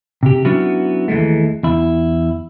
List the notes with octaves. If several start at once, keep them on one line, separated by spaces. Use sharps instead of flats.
C3 G4
F#3 B3 C#4 D4 E4 F#4
D#2 E3 G#3 A3
E2 E4